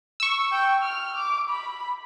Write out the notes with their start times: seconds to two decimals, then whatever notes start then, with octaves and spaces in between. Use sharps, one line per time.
0.20 C#6 E6
0.52 G5
0.83 F6
1.17 D6
1.50 B5